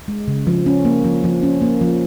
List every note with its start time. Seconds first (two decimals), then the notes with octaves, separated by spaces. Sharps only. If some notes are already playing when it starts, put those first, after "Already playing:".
0.08 G#3
0.28 C#3
0.47 F3
0.66 C#4
0.85 A#3
1.04 F3
1.24 F3
1.43 C#4
1.62 A#3
1.81 F3